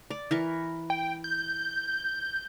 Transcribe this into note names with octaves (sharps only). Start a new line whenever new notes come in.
D5
E3 A#4 C#6
G5
G6